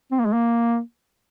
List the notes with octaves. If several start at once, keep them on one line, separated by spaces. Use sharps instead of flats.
C4
A#3
G#3
A#3